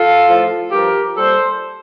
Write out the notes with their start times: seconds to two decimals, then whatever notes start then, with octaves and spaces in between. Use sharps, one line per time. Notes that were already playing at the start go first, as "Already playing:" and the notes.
Already playing: F4 A4
0.27 A2 F3
0.72 G2 F3 G4 A#4
1.17 A#2 G3 A4 C5